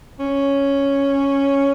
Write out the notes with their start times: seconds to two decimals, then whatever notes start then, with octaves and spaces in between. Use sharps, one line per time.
0.20 C#4